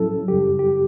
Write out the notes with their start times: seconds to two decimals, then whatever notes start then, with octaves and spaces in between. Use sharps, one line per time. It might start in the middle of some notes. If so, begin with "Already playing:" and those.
Already playing: A2 F#3 C#4 E4 A4
0.28 F#2 C#3 G3 G4
0.59 G4